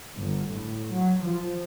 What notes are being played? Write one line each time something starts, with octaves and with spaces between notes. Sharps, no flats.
G1
A2
F#3
F3